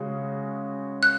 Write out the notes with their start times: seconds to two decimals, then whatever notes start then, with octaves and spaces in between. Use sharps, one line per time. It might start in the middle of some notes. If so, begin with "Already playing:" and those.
Already playing: C#3 G#3 C#4 F#4
1.03 F#6